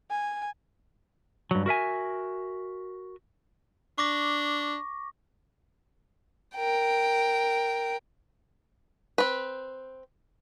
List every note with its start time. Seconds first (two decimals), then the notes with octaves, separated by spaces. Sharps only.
0.10 G#5
1.51 G2 F#3
1.66 F#4 A#4 E5 G#5
3.98 D4 C#6 D6 A#6
6.55 A#4 G5
9.18 C4 B4